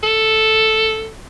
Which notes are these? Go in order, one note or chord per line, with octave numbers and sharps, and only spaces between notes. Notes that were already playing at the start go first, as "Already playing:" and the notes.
A4